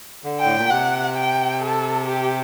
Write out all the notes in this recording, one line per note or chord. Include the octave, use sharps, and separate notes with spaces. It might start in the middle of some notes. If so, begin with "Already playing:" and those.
D3
G5
A2
A#2
C3 F#5
G5
A4
G4